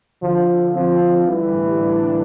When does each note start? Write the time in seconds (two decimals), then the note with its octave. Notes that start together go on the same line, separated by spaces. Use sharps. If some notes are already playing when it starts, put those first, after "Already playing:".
0.22 D3 F3
0.49 D3
0.74 F3 C4
1.01 D3
1.28 E3 G3
1.54 A2
1.80 D4
2.07 A#3